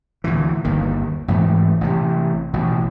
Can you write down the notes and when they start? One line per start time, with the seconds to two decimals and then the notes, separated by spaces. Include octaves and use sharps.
0.24 D2 A#2 E3
0.64 G1 D#2 D#3
1.28 A1 G#2 E3 A3
1.81 A1 C3
2.53 A1 B2